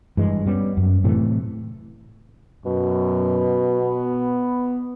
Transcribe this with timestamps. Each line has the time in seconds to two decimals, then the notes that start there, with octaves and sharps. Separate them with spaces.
0.17 G2 E3 G#3
0.46 G3 B3 C#4
0.77 F#2
1.04 A2 C3 E3 A3
2.65 F#2 B2
3.79 B3